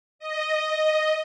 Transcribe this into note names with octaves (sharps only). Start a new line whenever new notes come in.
D#5